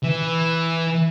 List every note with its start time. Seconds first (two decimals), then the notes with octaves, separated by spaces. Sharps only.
0.03 E3